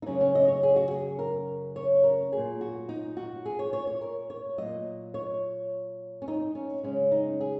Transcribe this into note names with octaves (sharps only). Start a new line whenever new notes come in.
D#4
F#2 C#3 F#3 C#4
C#4
D#5
C#5
G#4
F#4
G#4
A#4
C#5
A#4
A#2 F#3 G#4
F#4
D#4
F#4
G#4
C#5
C#5
C#5
A#4
C#5
A#2 F#3 D#5
C#5
C#4
D#4
C#4
F#2 C#3 G#3 C#4
D#4
G#4